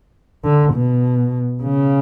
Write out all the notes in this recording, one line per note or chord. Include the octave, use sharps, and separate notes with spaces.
D3
B2
C#3